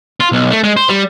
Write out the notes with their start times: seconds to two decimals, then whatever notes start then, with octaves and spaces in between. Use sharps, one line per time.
0.20 F4
0.32 B1
0.51 A3
0.63 G#3
0.77 C5
0.89 G3